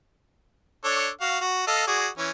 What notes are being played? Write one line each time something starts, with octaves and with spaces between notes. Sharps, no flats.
D4 A4 C#5
F#4 F5
F#4
A4 D#5 F5
F#4 G#4 D5
E3 C#4